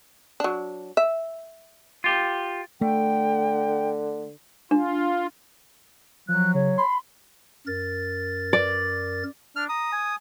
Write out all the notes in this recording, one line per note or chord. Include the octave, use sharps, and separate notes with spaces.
F#3 D4
E5
F4 G4
D3 A3 G5
D4 F4
F3 F#3 F#6
C#3 C#5
B5 C6
F#2 A#4 A6
D5
D4 F6
A#5 D#6
G#5